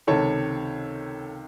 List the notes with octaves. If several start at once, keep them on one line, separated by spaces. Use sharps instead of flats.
C#2 C3 D#3 A4 C#5